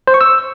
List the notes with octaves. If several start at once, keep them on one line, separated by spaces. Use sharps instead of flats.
C5
C#6
E6